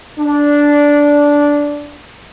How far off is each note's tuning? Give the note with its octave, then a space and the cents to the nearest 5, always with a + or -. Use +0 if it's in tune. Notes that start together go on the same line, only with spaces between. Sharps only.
D4 -10